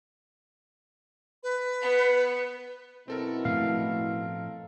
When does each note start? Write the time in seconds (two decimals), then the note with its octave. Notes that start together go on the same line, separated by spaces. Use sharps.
1.43 B4
1.82 B3
3.08 F#2 B2 C4 E4 A4 A#4
3.45 A2 F3 A3 F5